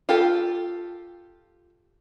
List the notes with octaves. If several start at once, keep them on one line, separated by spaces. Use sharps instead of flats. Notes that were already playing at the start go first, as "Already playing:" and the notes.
F4 G4 A4